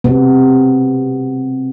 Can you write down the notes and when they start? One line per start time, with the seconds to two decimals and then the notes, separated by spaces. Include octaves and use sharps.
0.04 C3 B3